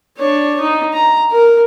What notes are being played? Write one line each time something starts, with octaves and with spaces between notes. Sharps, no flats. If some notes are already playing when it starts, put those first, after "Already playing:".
D4 C#5
D#4
A#5
A#4